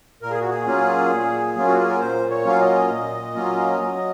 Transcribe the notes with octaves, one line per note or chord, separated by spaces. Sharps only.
A#2 A#4
G#4
F#4
G#4
F#3 A#3 C#4 F4
A#2
F#3 A#3 C#4 F4
F#4
G#4
A#4
A#2 C5
C#5
F#3 A#3 C#4 F4 F5
D#5
A#2
F#3 A#3 C#4 F4
F#3